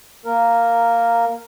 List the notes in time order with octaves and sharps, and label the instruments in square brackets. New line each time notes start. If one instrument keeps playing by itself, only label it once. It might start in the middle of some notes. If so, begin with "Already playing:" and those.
[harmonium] A#3 A#4